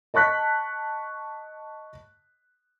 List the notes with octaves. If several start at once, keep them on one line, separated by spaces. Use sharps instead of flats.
D#5 A5 C#6 F#6 B6